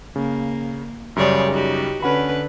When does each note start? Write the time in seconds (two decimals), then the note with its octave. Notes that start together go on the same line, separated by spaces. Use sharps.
0.16 C#3 A#3
1.16 F#2 C#3 G3 G#4 C#5 D5
1.51 D#4 F#4 G4
2.02 D3 C#4 B4 F#5 B5